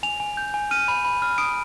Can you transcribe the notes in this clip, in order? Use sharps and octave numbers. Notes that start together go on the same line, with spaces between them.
G#5 F7
G#5
G6
G#5
F6 D#7
B5
B5
F6
D#6 D7